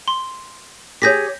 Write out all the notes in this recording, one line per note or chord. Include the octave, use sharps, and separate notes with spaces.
C6
G4 G#4 C#5 G6 A#6 B6